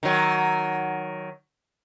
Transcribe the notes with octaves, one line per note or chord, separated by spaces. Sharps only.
D#3 F#3